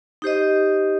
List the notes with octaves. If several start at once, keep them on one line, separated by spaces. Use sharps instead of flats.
D#4 G4 C5 D#5